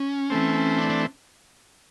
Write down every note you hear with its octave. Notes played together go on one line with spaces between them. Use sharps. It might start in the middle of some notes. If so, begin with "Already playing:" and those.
Already playing: C#4
E3 A3 C4
D4
D4